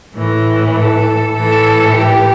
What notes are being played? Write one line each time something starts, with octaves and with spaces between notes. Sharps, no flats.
A2 E3
A4
A2 E3 A4
G4